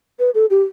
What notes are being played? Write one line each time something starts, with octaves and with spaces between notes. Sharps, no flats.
B4
A4
G4